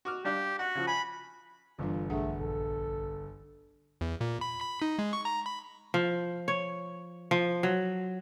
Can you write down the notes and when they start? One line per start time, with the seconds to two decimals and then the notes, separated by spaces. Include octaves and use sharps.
0.05 F#4 D6 F6
0.25 G3 D4 G4 F5
0.59 F#4 F#5
0.75 C#3 F3
0.87 G#5 B5
1.79 G1 E3 G3 D4 F4
2.10 A#1 A3 D4 G#4 F#5
2.41 A#1 A4
4.01 E2
4.21 A#2
4.41 B5
4.61 B5
4.82 D#4
4.99 G#3
5.13 C#6
5.25 A#5
5.46 B5
5.94 F3
6.48 C#5
7.31 F3
7.63 F#3